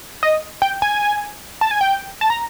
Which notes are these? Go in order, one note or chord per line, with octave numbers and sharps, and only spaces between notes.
D#5
G5
G#5
A5
G#5
G5
A5
A#5